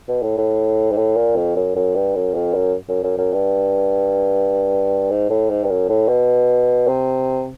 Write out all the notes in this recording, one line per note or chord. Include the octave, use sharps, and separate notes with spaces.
B2
A2
A2
G#2
A2
A#2
F2
F#2
F#2
G2
F#2
F2
F#2
F#2
F#2
F#2
G2
G#2
A2
G#2
G2
F#2
A2
B2
C3